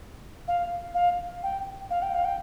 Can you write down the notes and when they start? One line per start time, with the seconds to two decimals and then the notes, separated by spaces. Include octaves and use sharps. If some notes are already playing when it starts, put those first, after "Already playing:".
0.48 F5
0.94 F5
1.43 G5
1.90 F5
2.02 G5
2.14 F5
2.25 G5